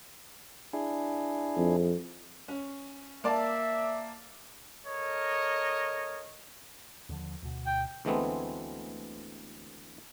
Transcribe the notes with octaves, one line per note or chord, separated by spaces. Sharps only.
D4 E4 G#4
F2
C#4
A#3 D5 E5 A5
A4 A#4 C#5 D#5
D#2 D3 F3
D2 B2
G5
D2 E3 G#3 A3 B3 C4